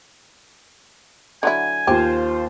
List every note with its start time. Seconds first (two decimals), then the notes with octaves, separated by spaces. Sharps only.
1.43 D3 F#3 E4 G#5
1.87 D#2 F4 G4 C5